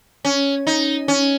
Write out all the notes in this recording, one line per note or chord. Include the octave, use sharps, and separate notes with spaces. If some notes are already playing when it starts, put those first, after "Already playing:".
C#4
D#4
C#4